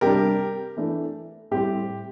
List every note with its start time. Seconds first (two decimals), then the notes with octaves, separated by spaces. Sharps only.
0.01 C3 G3 D4 G4 A#4
0.77 E3 A3 D4
1.51 A2 G3 C4 G4